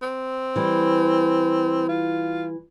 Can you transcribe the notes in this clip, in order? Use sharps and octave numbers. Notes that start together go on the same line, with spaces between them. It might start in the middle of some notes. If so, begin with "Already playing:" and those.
C4
E3 G3
F4